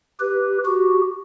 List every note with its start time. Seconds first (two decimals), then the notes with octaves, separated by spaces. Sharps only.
0.20 G4 B4
0.65 F#4 G4